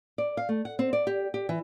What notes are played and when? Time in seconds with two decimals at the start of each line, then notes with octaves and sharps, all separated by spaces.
0.18 D5
0.37 F5
0.49 A3
0.65 F#5
0.79 C4
0.93 D5
1.07 G4
1.34 G4
1.49 E3